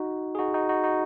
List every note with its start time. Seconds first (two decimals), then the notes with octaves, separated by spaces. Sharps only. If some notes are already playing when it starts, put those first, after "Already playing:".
Already playing: D#4 F#4
0.35 G#4
0.39 D#4 F#4
0.54 D#4 F#4
0.69 D#4 F#4
0.84 D#4 F#4